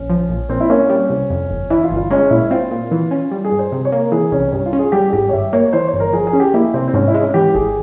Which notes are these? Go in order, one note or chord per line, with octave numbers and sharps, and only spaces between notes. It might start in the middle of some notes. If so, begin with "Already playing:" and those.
Already playing: A#1 C#4
F3
A#1
A#2 C4
E4
A#3 C#4
G3
C2
F2
G1
E3 E4
F4
G1
F4
G#3 C#4
A#2 E4
C4 F4
A#2
E3
C#4
G3
G#4
G2
C5
C3
C#5
A#3
A#4
E3 G#4
C2 C#4
G2 C#4
F4
C#4
G#4
G3 G4
G#4
G#1 G4
C#5
G2 E5
A#3 C#5
E3 C5
C#5
G1
A#4
F3 G#4
G#4
C#4
G4
A#3 E4
C3 C4
C4
G#2 C#4
E4
G#3
C#4
E3 G4
G#1 G#4